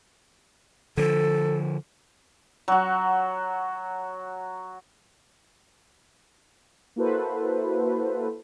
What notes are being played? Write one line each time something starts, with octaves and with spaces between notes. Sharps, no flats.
D3 F3 A4
F#3 F#4
A#3 E4 F#4 A4 B4 C5